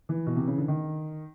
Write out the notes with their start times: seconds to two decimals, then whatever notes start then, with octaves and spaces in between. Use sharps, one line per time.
0.09 E3
0.27 B2
0.36 C3
0.48 C#3
0.58 D3
0.68 D#3